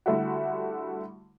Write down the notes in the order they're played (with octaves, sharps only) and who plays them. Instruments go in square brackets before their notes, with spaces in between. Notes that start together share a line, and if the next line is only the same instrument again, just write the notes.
[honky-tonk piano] D3 G3 A3 E4 F#4